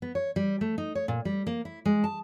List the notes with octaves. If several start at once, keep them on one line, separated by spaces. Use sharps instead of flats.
B3
C#5
G3
A3
D#4
C#5
A#2
G3
A#3
E4
G#3
A5